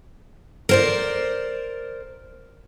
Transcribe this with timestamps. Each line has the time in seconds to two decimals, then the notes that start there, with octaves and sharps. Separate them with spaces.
0.69 A#4 C5 D5